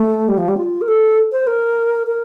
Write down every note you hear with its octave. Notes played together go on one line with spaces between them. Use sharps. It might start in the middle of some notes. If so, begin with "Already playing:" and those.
Already playing: A3
G3
F3
G3
F4
A#4
A4
C5
A#4
A#4